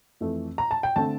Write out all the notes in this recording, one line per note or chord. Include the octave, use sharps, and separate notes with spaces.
F2 E3 A3
A#5
A5
G5
D3 A3 C4 A5